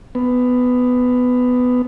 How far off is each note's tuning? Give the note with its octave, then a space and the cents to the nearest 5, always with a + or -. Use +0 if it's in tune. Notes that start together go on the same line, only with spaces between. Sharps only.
B3 +10